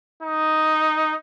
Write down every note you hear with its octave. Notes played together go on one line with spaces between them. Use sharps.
D#4